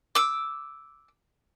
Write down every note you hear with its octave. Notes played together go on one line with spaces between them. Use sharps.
D6 E6